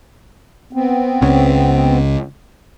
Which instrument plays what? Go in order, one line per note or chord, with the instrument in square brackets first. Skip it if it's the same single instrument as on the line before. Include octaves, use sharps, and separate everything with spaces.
[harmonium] B3 C4
[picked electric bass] C#2 C#3